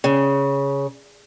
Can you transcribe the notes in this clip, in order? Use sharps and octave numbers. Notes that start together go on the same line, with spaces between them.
C#3